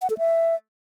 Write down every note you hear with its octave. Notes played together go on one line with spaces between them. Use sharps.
F#5
A4
E5